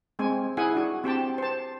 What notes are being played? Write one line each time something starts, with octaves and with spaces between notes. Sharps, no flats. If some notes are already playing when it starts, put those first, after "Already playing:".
G#3 C4 G#5
E4 G#4 F#5 G#5
D4 F#4
C4 G4 G5 A5
C5 A5